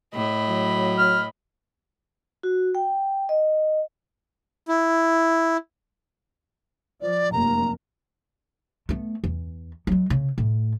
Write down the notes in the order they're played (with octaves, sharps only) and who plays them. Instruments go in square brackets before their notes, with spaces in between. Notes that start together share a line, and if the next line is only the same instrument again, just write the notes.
[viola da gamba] A2 [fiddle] D#5 B5
[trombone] F#3
[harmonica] F6
[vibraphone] F#4
G5
D#5
[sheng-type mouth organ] E4
[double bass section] F3 [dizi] D5
[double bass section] F1 F#2 A#3 [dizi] A#5
[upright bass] A3 B3
E2
F#3 G#3
C#3
A2